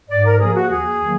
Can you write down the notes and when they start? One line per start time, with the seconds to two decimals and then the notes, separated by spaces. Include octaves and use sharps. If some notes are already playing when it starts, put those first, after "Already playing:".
0.09 G#2 D5
0.24 A#4
0.40 F3 A#3 G#4
0.55 F#4
0.70 D#2 G#4
1.01 D#3 F#3 A#3